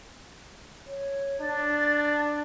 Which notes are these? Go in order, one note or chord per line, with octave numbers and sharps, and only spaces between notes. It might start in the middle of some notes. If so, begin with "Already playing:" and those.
C#5
D4 A6